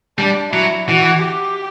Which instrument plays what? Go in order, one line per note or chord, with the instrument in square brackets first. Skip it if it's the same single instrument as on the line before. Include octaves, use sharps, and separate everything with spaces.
[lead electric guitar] G3 [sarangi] D4
[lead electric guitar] F#3 [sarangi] E4
[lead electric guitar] E3 [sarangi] F#4
[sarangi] G4